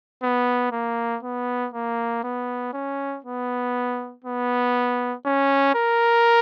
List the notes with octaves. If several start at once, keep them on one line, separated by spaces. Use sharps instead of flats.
B3
A#3
B3
A#3
B3
C#4
B3
B3
C#4
A#4